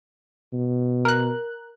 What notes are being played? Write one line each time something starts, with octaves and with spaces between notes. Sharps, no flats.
B2
A#4 F#6